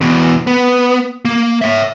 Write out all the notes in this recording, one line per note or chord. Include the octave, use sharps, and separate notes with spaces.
E2 B2
B3
A#3
C#5 E5